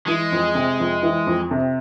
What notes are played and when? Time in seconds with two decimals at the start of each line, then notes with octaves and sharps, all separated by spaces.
0.07 E3 G#3
0.32 F2
0.55 C3
0.80 F2
1.03 E3
1.27 F2
1.51 C3